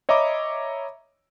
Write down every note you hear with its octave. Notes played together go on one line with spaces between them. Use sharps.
C#5 D#5 E5 A#5 B5 D6